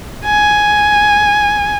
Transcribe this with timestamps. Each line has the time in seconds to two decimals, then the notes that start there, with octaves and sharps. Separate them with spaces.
0.25 G#5